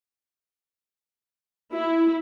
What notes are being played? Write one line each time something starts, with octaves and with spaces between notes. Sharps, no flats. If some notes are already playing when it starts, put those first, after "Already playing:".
E4